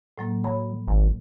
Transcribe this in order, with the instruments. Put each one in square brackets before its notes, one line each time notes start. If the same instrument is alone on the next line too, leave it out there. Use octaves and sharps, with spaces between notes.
[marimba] A2 F#3 A#3
[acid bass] F#3 [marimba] B5
[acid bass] G#1